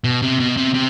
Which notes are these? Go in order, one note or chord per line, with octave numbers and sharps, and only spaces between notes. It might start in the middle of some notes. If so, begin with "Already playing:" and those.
B2
C3
B2
C3
C3